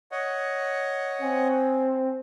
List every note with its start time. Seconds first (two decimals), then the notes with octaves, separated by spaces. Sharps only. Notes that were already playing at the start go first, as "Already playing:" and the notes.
0.12 C#5 D#5 F#5
1.22 C4 G#5